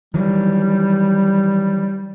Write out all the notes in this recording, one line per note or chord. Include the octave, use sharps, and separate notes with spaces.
D#3 E3 F#3 G3